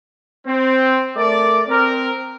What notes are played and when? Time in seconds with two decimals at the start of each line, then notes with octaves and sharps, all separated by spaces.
0.46 C4
1.16 A3 A#4 D5
1.68 C4 A#4